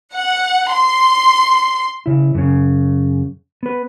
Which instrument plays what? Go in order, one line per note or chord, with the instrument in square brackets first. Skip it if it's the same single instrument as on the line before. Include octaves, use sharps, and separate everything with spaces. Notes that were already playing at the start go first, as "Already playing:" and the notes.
[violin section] F#5
C6
[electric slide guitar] C#3 E4
F#2 C#3
B3 B4